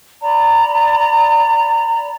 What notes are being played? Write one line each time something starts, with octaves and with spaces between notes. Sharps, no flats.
D5 A#5 B5